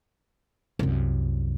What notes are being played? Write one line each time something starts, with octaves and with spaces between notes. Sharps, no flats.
C2 F#2